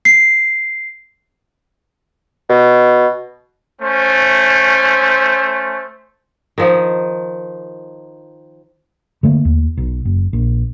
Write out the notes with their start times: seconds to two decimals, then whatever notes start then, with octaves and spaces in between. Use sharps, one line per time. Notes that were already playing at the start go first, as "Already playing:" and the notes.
0.05 C7
2.49 B2
3.82 A3 C#4 C5
6.58 D#3 F3
9.23 D3 A3 A#3
9.45 D#2
9.77 B1
10.05 F#1
10.33 A#1